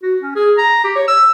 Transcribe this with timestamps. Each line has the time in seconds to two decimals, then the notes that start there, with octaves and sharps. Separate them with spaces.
0.02 F#4
0.22 C#4
0.35 G#4
0.58 A#5
0.84 G4
0.96 C#5
1.08 E6